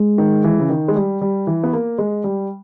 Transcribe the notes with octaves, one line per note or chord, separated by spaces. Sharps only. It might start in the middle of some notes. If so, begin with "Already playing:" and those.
Already playing: G#3
D#3
E3
C#3
D#3
G#3
G3
G3
E3
B3
A#3
G#3
G3